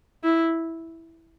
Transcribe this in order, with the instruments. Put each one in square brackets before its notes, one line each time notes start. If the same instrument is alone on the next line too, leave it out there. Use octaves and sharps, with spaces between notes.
[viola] E4